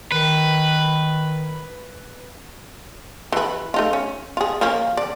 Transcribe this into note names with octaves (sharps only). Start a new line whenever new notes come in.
D#3 B4
E3 B4
A3 D#4 F4
C#4
F4 G#4
F3 A#3 C#4
D5